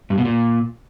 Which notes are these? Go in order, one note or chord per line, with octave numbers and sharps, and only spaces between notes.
G2
B2
A#2